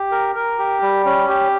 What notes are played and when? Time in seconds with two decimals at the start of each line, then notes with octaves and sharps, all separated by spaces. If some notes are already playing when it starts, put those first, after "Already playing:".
Already playing: G4
0.12 A#4
0.35 A#4
0.59 G4
0.82 G3
1.06 C#4
1.29 G4